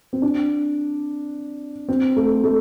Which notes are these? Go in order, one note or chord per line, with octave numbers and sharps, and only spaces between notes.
C4
D4
C4
A3
A3